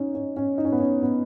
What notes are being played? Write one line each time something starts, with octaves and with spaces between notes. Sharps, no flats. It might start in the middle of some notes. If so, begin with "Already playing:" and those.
Already playing: C#4 D#4
C#4
C#4
D#4
C#4
B3
C#4
B3